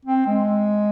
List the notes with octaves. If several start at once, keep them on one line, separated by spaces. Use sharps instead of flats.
C4
G#3